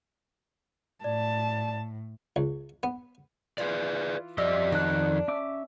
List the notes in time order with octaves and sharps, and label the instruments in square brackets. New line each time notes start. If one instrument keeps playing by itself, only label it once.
[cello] A2 [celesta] D5 [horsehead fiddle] A5
[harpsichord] C#2
B3
[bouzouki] E3 F4 [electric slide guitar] G#4 B4 D5
[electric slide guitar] F2 D#5 [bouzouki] G3 [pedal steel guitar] E5
[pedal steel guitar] D#3 F#6 [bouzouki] D4
[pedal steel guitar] C#4 E5 D6